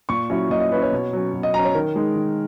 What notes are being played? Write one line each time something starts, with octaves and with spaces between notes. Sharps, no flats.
A#2 C#6
F#3 C#4 E4
A#2 D#5
D#5
F#3 C#4 E4 B4
C#5
B2
F#3 C#4
B2
D#5
F#3 C#4 A#5
C#5
D#3 A#4
G#3 D#4
D#3